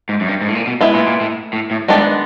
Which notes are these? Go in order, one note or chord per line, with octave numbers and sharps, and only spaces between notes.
G#2
F#2
G2
G#2
A2
A#2
B2
G#3 B3 E4
A#2
A#2
A2
A2
A2
G2 D#3 G#3 B3 D4